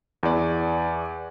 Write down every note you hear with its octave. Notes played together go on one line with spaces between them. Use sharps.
E2 D5